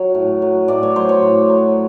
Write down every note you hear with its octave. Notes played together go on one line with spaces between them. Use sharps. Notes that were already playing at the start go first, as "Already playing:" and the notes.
Already playing: F#3 C#5
A2
F#3
A2 D5
C#5
F#3 C5
C#5
A2
F#3